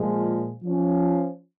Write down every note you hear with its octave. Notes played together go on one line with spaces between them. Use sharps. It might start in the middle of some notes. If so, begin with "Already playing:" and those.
Already playing: A#2 F3 G#3
F3 C#4